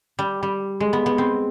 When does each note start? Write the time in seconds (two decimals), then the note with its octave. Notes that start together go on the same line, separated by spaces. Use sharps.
0.19 G3
0.43 G3
0.80 G#3
0.93 B3
1.06 B3
1.18 C4